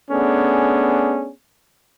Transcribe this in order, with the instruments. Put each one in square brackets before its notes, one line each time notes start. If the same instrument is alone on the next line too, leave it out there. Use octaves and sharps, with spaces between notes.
[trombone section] A3 B3 C#4 D4 G#4